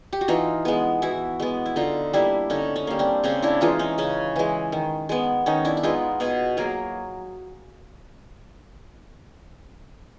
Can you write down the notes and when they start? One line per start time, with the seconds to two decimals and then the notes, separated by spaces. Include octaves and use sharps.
0.13 G4
0.21 F#4
0.28 E3 D#4 F4
0.65 G#3 B3
1.02 E3 E4 F#4
1.40 G#3 B3
1.66 E4
1.76 D3 D#4 F4
2.13 G3 A#3 D4 E4
2.50 D3 C#4 D#4
2.76 C#4
2.87 G3 A#3
2.99 C4 D4
3.24 C#3 C4 D4
3.42 D4 E4
3.61 E3 G#3 D#4 F4
3.79 C#4 D#4
3.98 C#3 C#4
4.36 E3 G#3
4.72 D#3
5.09 G#3 B3
5.46 D#3 C#4 D#4
5.65 D4 E4
5.77 E4
5.83 G#3 B3 D#4 F4
6.20 B2 F#4 G#4
6.57 F#3 A#3 G#4 A#4